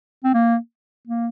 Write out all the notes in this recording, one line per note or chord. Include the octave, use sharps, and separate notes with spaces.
C4
A#3
A#3